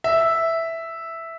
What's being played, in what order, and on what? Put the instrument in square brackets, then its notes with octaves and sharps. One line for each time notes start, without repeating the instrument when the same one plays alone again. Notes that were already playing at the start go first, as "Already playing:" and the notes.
[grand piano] E5